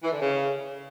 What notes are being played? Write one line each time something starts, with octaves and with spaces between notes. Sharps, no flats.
E3
D3
C#3